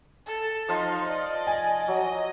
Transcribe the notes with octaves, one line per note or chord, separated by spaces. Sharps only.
A4
F3 D#4 F5 C6
D5 D#5
G#5
F#3 D#5